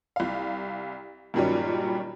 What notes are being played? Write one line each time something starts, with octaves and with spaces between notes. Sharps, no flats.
C2 F5
G2 A#2 D#3 F#3 G3 C#4